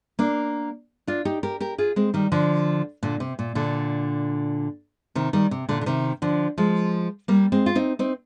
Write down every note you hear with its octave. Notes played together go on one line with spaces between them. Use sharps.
A#3 D4
D4 F4
D#4 G4
G4 A#4
G4 A#4
F4 G#4
G#3 C4
D#3 G3
D3 F3
A#2 D3
C3
A#2
A#2 D3
C3 D#3
D#3 G3
C3
A#2 D3
D3
C3 D#3
D3 F3
F3 G#3
G3 A#3
G#3 C4
F4
C4 D#4
C4 D#4